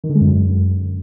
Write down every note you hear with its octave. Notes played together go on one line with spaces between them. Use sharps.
D#3
D3
G#3
F#2